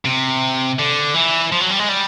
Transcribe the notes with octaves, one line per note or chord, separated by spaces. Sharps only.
C3
D3
E3
F3
F#3
G3
G#3
G3